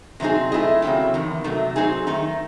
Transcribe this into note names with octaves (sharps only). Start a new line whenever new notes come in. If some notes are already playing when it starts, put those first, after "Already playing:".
C3 F#3 C4 D#4 G#4
A3 C4 E4 G#4 D#5
C#3 F#3 C4 E4
E2 C3 D#3
C3 F#3 A3 D#4
F#3 C4 D#4 G#4
D#3 A3 D#4